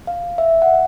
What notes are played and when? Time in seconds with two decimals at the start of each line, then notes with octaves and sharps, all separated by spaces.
0.07 F5
0.38 E5
0.62 F#5